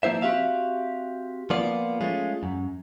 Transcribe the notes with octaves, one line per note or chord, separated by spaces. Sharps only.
F3 A#3 E4 C5 E5
C4 F#4 G4 E5 F5
F3 A#3 B3 F4 D5
G#3 A3 C#4 F4
F#2